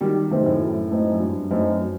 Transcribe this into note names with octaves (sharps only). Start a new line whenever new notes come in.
D#3 F#3 G3
C3 D#3 A3 C4 D#4
F#2 A2
F#3
A3 C4 D#4
F#2
G2 F#3
F#2 A3 C4 D#4
F#3